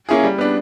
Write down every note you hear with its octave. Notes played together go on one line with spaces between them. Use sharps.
A#3 C#4 E4 G#4
G3
B3 D4